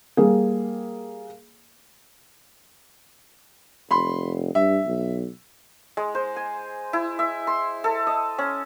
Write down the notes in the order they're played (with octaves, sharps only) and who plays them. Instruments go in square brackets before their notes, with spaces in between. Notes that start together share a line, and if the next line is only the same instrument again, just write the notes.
[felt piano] G3 A#3 G#4
[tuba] F1 [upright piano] B5 C6
[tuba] G2 [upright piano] E5
[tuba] B1
[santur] G#3
C5
G#5
E4
E5
C6
A4
D#5
C#4